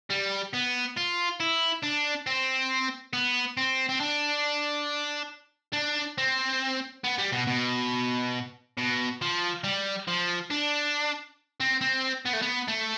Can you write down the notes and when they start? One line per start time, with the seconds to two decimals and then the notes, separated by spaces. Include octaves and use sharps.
0.10 G3
0.53 B3
0.97 F4
1.40 E4
1.83 D4
2.27 C4
3.13 B3
3.57 C4
3.89 C4
4.00 D4
5.73 D4
6.18 C4
7.04 B3
7.18 G3
7.33 B2
7.47 B2
8.77 B2
9.22 F3
9.64 G3
10.08 F3
10.51 D4
11.60 C4
11.81 C4
12.25 B3
12.33 A3
12.42 B3
12.68 A3